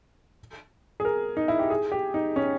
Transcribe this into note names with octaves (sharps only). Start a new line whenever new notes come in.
G#4
A#4
D#4
E4
G4
G#4
G4
D#4
C#4